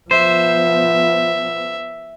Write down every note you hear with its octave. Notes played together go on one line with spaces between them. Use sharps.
F3 B3 C5 E5